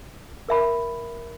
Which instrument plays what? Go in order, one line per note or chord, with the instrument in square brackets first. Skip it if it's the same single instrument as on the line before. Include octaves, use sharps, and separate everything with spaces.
[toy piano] A#4 E5 B5